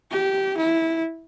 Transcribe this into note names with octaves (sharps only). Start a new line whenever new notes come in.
G4
E4